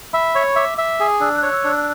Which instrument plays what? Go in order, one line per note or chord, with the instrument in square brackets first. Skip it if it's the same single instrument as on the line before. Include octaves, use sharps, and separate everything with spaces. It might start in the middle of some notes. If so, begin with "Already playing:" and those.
[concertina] E5 [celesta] B5
[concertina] C#5 [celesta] C#6
[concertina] E5 [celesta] D6
[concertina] E5
G#4
[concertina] D4 [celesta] E6
[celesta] F#6
[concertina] C#5
[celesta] E6
[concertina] D4
[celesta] E6